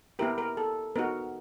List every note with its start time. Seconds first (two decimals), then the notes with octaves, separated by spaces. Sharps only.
0.19 B3 E4 G4 A#4
0.38 A#4
0.57 A4
0.96 B3 D#4 F#4 A#4